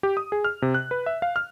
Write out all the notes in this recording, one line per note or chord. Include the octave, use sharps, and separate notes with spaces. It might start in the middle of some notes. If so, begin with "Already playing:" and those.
G4
D#6
G#4
F6
C3
F#6
B4
E5
F5
F6